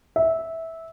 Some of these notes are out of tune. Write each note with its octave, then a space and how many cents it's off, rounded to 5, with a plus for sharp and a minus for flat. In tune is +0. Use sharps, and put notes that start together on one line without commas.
E5 -15